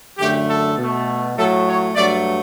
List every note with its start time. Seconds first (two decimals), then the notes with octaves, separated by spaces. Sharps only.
0.18 F#2 D3 A3 G4
0.48 A4
0.77 B2 A3
1.36 A2 F#3 A3 A4
1.66 C#5
1.96 G2 F#3 A3 D5